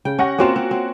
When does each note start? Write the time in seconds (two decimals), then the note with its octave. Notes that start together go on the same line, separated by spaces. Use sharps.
0.05 C#3 G5
0.19 C#4 G4 F#5 A#6
0.39 A#3 C4 C#4 F4 F#4 E7
0.56 C4
0.71 C4